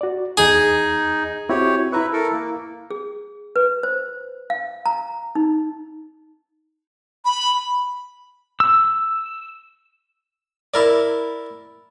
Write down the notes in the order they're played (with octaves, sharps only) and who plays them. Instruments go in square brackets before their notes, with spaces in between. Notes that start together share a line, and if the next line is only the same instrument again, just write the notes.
[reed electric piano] F#4 D5
[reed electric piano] E2 D#6 [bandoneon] D#4 [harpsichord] G#4
[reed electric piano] C4 E4 F#4 [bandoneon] G4 C#5
[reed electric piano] E4 A#5 C#6 [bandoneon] B4 E5
[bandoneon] A4 A#4
A#3
[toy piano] G#4
B4
C5
F5
A#5
D#4
[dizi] B5
[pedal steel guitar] E6
[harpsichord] E4 A#4 D5